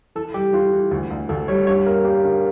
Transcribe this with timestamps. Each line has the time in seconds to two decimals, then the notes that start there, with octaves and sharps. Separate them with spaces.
0.15 E3 A4
0.34 G3 G4
0.53 E3 F4
0.73 E3
0.91 D2
1.10 D2
1.29 D2 A4
1.48 G3 C#5
1.67 G2 C#5
1.86 A#3 A#4
2.05 A#3 G4
2.24 D3